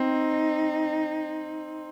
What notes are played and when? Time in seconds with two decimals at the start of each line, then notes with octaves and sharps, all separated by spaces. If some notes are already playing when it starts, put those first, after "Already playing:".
Already playing: C4 D#4